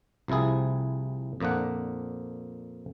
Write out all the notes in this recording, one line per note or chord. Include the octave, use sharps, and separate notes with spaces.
C2 C3 F3 E4 G#4
F2 A#2 A#3 D4 F#5